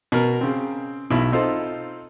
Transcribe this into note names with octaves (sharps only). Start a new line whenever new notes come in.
B2 A#4
C#3 C4
B1 B2 E4 B5
C4 D#4 F4 A4 C5